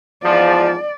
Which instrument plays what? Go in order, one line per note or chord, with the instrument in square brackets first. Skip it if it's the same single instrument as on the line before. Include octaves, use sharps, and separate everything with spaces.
[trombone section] E2 G#2 F3 [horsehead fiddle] D5